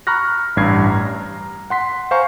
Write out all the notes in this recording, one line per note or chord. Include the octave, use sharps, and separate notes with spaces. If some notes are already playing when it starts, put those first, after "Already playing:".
A#5 B5 C#6 F6 F#6 A#6
A1 G2 G3 G#6 C7
A#5
F#5 C6 B6
C5 F5 G#5 A#5 C#6